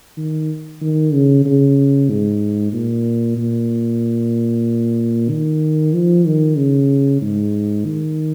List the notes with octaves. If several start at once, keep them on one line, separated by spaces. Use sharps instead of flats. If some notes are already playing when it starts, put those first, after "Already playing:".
D#3
D#3
C#3
C#3
G#2
A#2
A#2
D#3
F3
D#3
C#3
G#2
D#3